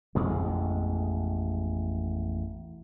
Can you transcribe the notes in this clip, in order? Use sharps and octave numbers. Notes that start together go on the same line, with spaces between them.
A1 F2 B2 G#3